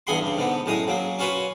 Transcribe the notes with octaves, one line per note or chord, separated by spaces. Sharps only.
E2 G2 G#4 F#5 B5 C6
G2 C#3
G#2 D3 B3
F#2 A2 G#3 A#5 D#6
C#3 F#3 A#3
C#4 F4 F#4 B4 C#5